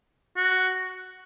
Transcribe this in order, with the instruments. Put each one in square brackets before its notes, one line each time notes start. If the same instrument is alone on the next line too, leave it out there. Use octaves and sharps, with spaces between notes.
[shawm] F#4